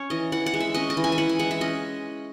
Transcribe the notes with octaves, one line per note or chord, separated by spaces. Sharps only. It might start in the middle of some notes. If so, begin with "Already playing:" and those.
Already playing: C#4 C#5
E3 D#5
E3 F#5
F#5
G#3
E5
C#4 D#5
D#5
E3
G#5
E5
E3 F#5
G#5
G#3 F#5
E5
C#4 D#5